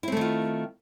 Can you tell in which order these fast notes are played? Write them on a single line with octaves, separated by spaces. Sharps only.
E4 C4 A3 D#3 F4